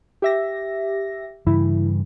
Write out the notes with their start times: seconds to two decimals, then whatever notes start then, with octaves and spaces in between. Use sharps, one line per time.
0.22 G4 E5 A#6
1.47 G2 C#3 E3 E4